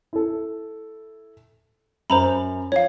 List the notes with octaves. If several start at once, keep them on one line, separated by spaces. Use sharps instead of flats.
E4 A4
F#2 C5 A#5 B5
F3 C#5 F5